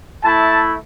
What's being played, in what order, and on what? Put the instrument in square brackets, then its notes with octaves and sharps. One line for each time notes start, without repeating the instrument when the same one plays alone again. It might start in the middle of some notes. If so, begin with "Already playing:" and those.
[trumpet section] A3 E4 A5